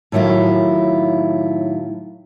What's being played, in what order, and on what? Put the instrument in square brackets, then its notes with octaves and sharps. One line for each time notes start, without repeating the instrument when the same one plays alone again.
[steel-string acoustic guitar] A2 D#3 F#3 E4 F4